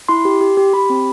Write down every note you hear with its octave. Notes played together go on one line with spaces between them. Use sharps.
E4 C6
G4
G4
G4
G4 B5
C4